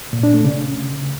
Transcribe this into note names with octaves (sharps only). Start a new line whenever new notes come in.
A#2
D4
A3
C#3